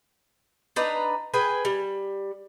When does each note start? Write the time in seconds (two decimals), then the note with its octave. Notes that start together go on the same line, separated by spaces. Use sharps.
0.76 D4 D#4 B4 A#5
1.34 G#4 B4 G5 G#5
1.65 G3